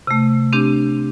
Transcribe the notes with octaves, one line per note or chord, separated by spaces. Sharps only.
C3 A3
C4 D4 G4